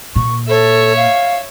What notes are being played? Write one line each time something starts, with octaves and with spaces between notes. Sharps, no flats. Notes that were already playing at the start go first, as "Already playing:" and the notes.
A#2 C#6
A4 C#5 E5
F5